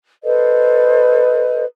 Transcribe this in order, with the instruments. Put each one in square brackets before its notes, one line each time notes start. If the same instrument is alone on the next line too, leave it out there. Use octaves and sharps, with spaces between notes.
[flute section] A4 B4 C5 D#5